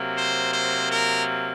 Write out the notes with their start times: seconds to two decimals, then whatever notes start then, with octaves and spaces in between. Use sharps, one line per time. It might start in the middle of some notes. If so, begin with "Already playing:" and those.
Already playing: C3 F#3 A#3
0.15 C5
0.53 C5
0.90 A#4